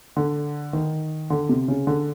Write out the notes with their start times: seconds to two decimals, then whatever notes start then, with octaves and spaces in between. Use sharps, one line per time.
0.17 D3
0.73 D#3
1.30 D3
1.49 C3
1.68 C#3
1.87 D3